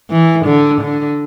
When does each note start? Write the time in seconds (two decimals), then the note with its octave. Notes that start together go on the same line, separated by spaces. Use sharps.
0.10 E3
0.46 D3
0.81 D3